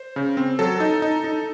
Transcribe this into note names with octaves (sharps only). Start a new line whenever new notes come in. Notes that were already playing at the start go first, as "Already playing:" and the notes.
Already playing: C5
C#3
C4
F#3 A4
D#4
D#4
D#4